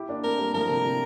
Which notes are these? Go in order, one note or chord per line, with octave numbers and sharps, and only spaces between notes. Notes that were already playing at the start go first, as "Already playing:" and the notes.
Already playing: E4 G4
A#3 D4
A3 C4 A#4
G3 A#3
F3 A3 A#4
C3
C3